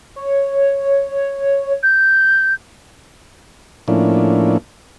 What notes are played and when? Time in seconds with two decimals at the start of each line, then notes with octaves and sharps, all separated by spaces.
0.16 C#5
1.83 G6
3.88 A2 F3 A#3 C#4 D4 E4